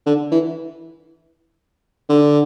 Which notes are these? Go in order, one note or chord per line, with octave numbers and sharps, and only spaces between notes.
D3
E3
D3